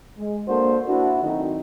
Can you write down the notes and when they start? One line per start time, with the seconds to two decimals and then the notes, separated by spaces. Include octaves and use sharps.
0.18 G#3
0.48 A#3 D4 F#4 A4 A#4 C5
0.87 D4 E4 F#4
1.22 D#3 F#3 A3 C4 D#4